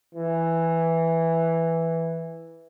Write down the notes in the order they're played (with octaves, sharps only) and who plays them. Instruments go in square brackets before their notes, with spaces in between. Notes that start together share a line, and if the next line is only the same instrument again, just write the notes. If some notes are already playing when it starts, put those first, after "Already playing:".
[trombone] E3